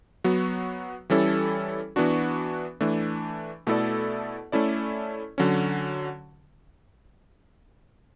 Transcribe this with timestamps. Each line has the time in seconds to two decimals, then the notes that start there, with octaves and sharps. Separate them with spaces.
0.24 F#3 B3 F#4
1.10 E3 G3 C#4 E4 A4
1.96 E3 B3 D4 F#4
2.81 E3 A3 D4
3.67 B2 A3 E4 A4 D5
4.52 A3 C#4 E4 A4 D5
5.38 D3 F#3 C#4